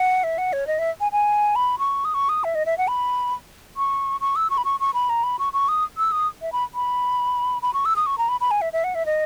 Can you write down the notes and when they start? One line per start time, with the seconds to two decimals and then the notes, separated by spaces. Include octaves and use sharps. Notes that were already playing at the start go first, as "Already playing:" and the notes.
Already playing: F#5
0.24 E5
0.38 F#5
0.53 C#5
0.67 D#5
0.79 E5
1.00 G#5
1.12 G#5
1.56 B5
1.79 C#6
2.05 D#6
2.14 C#6
2.29 D#6
2.44 E5
2.55 D#5
2.66 E5
2.78 F#5
2.88 B5
3.77 C#6
4.21 C#6
4.36 E6
4.50 C#6
4.57 B5
4.65 C#6
4.80 C#6
4.94 B5
5.09 A#5
5.23 B5
5.39 C#6
5.53 C#6
5.68 D#6
5.98 E6
6.12 D#6
6.42 E5
6.52 B5
6.74 B5
7.62 B5
7.74 C#6
7.85 E6
7.96 D#6
8.06 C#6
8.18 A#5
8.29 B5
8.41 B5
8.51 G#5
8.61 E5
8.73 E5
8.84 F#5
8.95 E5
9.06 D#5